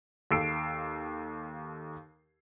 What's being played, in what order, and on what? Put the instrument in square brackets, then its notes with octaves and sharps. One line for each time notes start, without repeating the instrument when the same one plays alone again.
[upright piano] D#2 A4 F5 E6 C7 D7